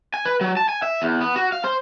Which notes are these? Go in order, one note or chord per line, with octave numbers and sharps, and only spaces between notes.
G#5
B4
F#3
A5
G#5
E5
E2
B3
F#4
F5
C5